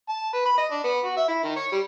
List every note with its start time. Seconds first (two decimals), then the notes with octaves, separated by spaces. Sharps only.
0.09 A5
0.33 B4
0.46 B5
0.58 D#5
0.71 D4
0.84 B3
1.04 F#4
1.17 E5
1.28 E4
1.43 D#3
1.56 C#5
1.72 G3